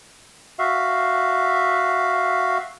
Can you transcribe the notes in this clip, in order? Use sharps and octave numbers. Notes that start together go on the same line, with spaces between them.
F#4 E5 F5